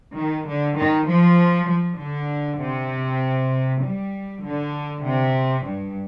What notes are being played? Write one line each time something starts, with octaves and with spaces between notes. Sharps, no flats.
D#3
D3
D#3
F3
F3
D3
C3
G3
D3
C3
G2